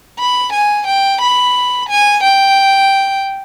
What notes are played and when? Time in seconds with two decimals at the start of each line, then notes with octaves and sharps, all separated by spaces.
0.19 B5
0.53 G#5
0.87 G5
1.21 B5
1.89 G#5
2.24 G5